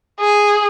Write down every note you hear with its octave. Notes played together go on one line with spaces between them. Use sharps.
G#4